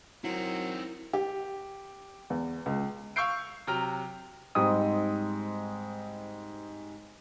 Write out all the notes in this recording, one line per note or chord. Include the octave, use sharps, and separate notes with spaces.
F#3 C4 D#4 E4 A#4
G4
E2
C#2
F5 C#6 E6 G6 C7 D7
C3 F#3 G5 A#5 F6
G#2 G3 C4 D#4 G5 D#6